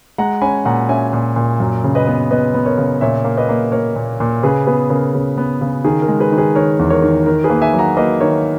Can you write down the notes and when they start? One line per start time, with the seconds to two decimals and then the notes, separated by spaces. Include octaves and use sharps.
0.18 G#3 F#5 A#5
0.41 C#4 G#5 B5
0.65 A#2 F#5 A#5
0.89 C#4 E5 G#5
1.13 A#2
1.36 A#2
1.60 F#2
1.84 C#3
1.95 B4 D#5
2.07 B3
2.31 B3 B4 D#5
2.54 B3
2.66 A#4 C#5
2.78 C#3
3.01 A#2 C#5 E5
3.25 A#3
3.37 B4 D#5
3.49 A#3
3.72 A#3 A#4 C#5
3.96 A#2
4.20 A#2
4.43 C#3 G#4 B4
4.66 B3 G#4 B4
4.90 C#3 A#4
5.14 C#3
5.38 B3
5.61 C#3
5.84 D#3 G#4
6.02 A#4
6.08 G#3
6.20 G#4 B4
6.32 D#3
6.38 G#4 B4
6.55 D#3 A#4 C#5
6.79 E2
6.90 A#4 C#5
7.02 D#3
7.26 D#3 A#4
7.44 G#4 B4
7.50 A#3
7.62 E5 G#5
7.74 F#3
7.79 F#5 A#5
7.97 A#3 B4 D#5
8.21 D#3 A#4 C#5